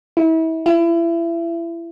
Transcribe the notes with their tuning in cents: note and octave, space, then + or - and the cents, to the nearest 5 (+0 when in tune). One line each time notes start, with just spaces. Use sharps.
E4 -35
E4 +30